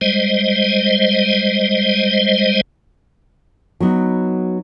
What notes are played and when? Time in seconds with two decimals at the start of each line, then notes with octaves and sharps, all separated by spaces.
0.01 G3 G#3 C5 D#5
3.80 F#3 B3 D#4